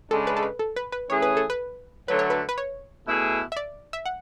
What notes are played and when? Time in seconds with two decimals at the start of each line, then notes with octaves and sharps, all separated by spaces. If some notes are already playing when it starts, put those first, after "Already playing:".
0.11 C#3 G#3 D4 A4
0.27 B4
0.37 A4
0.43 B4
0.59 A4
0.76 B4
0.92 B4
1.09 E3 A3 C#4 G#4 C#5
1.22 B4
1.37 A4
1.50 B4
2.08 D3 F#3 A3 B4
2.19 C#5
2.30 B4
2.49 B4
2.58 C#5
3.07 B2 A3 E4 G#4
3.52 E5
3.57 D5
3.93 E5
4.06 F#5